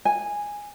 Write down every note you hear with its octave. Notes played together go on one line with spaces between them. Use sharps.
G#5